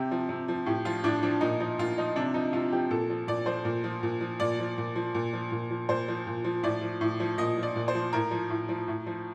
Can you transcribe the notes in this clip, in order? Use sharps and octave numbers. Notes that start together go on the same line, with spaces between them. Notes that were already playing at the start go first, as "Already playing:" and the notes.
Already playing: C3 G4
F3
C3
F3
A2 G4
F3 F4
A2 D4
F3 D4
A#2 D#4
F3 D#4
A#2 F4
F3 D#4
C3 D4
F3 D#4
C3 F4
F3 G4
A#2 A4
F3
A#2 D5
F3 C5
A#2
F3
A#2
F3
A#2 D5
F3
A#2
F3
A#2
F3
A#2
F3
A#2 C5
F3
A#2
F3
A2 D5
F3
A2
F3
A#2 D#5
F3
D5
A#2
C5
F3
A2 A#4
F3
A2
F3
A2
F3